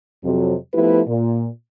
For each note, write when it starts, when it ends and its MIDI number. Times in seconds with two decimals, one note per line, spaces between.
0.24 0.55 41
0.24 0.55 48
0.24 0.55 54
0.74 1.01 53
0.74 1.01 57
0.74 1.01 59
0.74 1.01 64
0.74 1.01 67
0.74 1.01 71
1.07 1.47 46